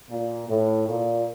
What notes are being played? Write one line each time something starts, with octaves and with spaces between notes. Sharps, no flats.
A#2
A2
A#2